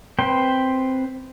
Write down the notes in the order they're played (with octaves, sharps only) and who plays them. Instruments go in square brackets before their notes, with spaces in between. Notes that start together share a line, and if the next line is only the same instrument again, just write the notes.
[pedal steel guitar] C4 B4 C5 G5